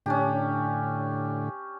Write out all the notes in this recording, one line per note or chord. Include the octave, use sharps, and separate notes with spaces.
A2 D3 C#4 D4 G4